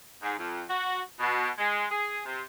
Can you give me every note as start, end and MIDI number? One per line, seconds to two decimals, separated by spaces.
0.22 0.34 44
0.38 0.62 41
0.68 1.01 66
1.20 1.48 47
1.58 1.84 56
1.90 2.21 68
2.25 2.41 48